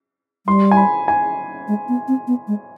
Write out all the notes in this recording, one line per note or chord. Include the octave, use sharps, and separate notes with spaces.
G3 C6
G#5
B5
G#5
G#3
B3
C4
B3
G#3